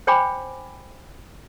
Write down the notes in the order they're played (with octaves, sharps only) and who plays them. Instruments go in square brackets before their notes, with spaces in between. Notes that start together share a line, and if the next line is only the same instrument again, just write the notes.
[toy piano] C5 C#5 G5 G#5 B5 D6